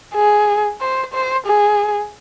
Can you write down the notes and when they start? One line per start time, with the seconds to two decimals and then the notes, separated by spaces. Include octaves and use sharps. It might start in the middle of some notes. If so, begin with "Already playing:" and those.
0.15 G#4
0.81 C5
1.14 C5
1.47 G#4